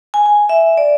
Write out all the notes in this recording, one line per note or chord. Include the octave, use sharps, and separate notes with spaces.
G#5
G#5
E5
D5